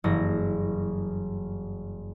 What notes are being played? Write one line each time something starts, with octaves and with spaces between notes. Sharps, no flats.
F#1 G2 E3 A#6